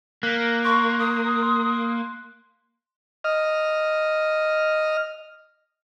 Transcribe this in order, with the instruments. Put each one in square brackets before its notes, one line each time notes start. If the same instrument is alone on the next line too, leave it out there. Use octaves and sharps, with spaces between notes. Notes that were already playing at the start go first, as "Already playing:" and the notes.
[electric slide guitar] A#3 [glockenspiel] F#6 A#6 B6
[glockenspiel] C6 F#6 D7 [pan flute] C#6
[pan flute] D#6
[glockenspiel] C6
[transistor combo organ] D#5 F6